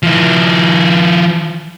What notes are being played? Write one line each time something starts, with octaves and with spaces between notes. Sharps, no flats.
F3 E4